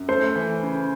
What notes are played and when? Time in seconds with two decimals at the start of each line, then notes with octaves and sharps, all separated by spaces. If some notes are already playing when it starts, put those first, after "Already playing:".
Already playing: F#2
0.08 A3 C5
0.36 E3
0.62 C#3